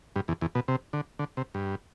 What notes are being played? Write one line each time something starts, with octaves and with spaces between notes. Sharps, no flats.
G2
E2
E2
B2
C3
D3
D3
C3
G2